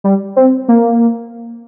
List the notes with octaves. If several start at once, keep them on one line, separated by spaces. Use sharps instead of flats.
G3
C4
A#3